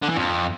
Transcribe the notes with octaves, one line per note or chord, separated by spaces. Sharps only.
D3
E3
F2